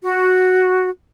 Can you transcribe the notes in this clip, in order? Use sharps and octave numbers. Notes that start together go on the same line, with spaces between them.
F#4